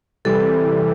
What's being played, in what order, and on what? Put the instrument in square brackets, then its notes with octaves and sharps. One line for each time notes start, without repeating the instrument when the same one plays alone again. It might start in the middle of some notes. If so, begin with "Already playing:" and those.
[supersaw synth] C3 E3 G3 [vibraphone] A4